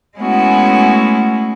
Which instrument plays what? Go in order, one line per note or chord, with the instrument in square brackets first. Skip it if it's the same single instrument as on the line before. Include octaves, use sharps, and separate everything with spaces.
[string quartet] G#3 A3 B3 C#4 E4 F#4